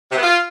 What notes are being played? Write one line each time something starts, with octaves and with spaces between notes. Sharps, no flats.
C3
B3
F4